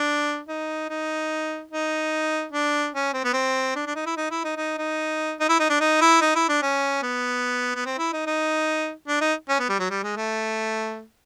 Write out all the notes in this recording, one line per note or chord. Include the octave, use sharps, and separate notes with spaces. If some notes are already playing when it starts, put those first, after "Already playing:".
Already playing: D4
D#4
D#4
D#4
D4
C#4
C4
B3
C4
D4
D4
D#4
E4
D#4
E4
D#4
D#4
D#4
D#4
E4
D#4
D4
D#4
E4
D#4
E4
D4
C#4
B3
B3
C4
E4
D#4
D#4
D4
D#4
C#4
B3
G3
F#3
G3
G#3
A3